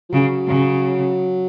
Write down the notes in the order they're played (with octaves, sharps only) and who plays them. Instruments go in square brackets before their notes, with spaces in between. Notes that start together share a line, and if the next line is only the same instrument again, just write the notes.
[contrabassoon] F3
[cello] C#3 [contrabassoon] F#3
[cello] C#3